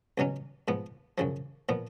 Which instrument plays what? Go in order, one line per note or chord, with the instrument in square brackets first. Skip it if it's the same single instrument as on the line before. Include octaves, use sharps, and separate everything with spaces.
[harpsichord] C#2 B2 F#3 C#4
G#2 F3 B3
F#2 C#3 F3
A#2 F3 B3